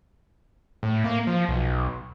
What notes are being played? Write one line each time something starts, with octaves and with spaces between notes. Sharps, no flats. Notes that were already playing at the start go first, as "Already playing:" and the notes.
A2
A#3
F3
B1